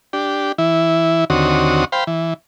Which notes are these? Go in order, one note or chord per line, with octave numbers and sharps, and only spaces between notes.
D4 G4
E3 E4
D#2 D3 C4 F#4 C#5 D#6
C5 F5 G5 B5
E3